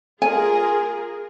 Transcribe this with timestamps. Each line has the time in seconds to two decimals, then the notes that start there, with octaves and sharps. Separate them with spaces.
0.22 F4 G#4 A#4 G#5